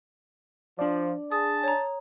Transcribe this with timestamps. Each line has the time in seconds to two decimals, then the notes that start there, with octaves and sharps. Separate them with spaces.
0.79 F3 D4 D5
1.32 G#4 A5 D#6
1.64 C#5 A#5